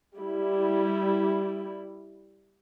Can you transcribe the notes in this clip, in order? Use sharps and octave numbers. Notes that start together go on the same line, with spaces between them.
G3 E4